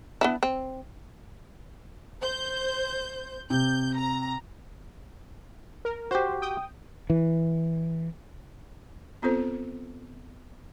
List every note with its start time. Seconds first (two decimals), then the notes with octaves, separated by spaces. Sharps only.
0.21 B3 D4 E4
0.43 C4
2.22 C5 G6
3.50 C3 G6
3.96 A#5
5.85 A#4
6.11 F#4 G4 C5
6.42 G5 D#6
7.10 E3
9.22 B3 C4 F4 A4 C5